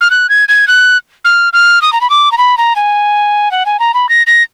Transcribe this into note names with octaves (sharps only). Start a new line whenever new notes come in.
F6
F#6
G#6
G#6
F#6
F6
F6
D#6
A#5
B5
D6
A#5
B5
A#5
G#5
F#5
G#5
A#5
B5
A#6
A#6